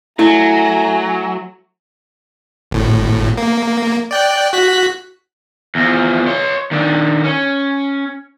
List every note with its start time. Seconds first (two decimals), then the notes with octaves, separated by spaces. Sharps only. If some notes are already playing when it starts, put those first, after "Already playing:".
0.19 F#3 A3 E4 G#5 A#5
2.71 G#1 A2
3.38 A#3
4.11 D5 G5 F#6
4.53 F#4 F#6 B6
5.75 E2 F3
6.28 C#5 C6
6.71 D#3 D4
7.24 C#4